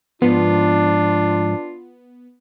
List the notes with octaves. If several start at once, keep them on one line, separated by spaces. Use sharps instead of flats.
G#2 F3 B3 D4 F4